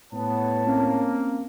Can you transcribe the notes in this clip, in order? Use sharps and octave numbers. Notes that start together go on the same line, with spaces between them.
A2 B3 C#5 A5
A#3 C4 C#4